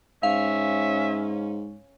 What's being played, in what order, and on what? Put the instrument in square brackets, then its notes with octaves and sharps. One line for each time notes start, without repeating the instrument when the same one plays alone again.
[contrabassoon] G#2 [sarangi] C#4 [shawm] E5 [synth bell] F5